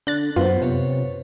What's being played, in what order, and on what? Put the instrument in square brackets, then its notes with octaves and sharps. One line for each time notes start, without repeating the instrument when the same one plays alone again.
[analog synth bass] D3 [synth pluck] F#6 A6
[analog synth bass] F#2 [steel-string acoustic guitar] B3 C5 [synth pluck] F4
[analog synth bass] C3 [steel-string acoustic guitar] C#5